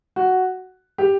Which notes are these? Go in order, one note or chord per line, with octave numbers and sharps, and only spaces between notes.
F#4
G4